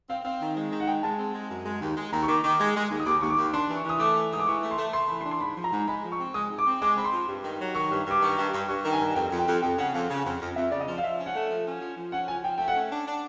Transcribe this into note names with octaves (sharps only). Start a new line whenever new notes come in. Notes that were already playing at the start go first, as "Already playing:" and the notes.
C4 F5
C4 F5
D#3
G#3
D#3
F#5
G#3 G5
G#3 A5
C4
G#3
F#2
G#3
D#2
G#3
D#2 A#5
C#6
D#3 D6
D#3 D6
G#3
G#3
D#2
D#6
D#2 D6
D#2 C#6
D6
D#2
D4 C6
E3
C#6
E3 D#6
A3 D6
E3
G#2 D#6
D6
E3 C#6
A3
C6
A3
A3 C6
E3 B5
C6
D4
C6
G#2 B5
F3
A#5
G#2
G#3 B5
F3
C#6
C4
G#3 D#6
G#2
D6
C4
G#3 D6
C4 B5
C6
F3
G2
D#3
F#3
D#3 C#6
G2
G2 D6
D#3 C#6
G2
G2
G2 C#6
D#3
G#5
G2
F2 G5
F2
G5
F2
F2 G5
C#3 F#5
F2 F5
C#3
F2
F2
F2 E5
C#3 D5
D#5
F3
F5
F3 E5
C#4
F#5
A3
F3
C#4
F3
F3
C#4 F#5
F3 G#5
F3 G5
A3 G5
F#5
C#4
D4
D4